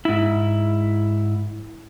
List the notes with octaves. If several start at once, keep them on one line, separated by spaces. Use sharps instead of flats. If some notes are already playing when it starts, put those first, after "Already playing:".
G#2 E4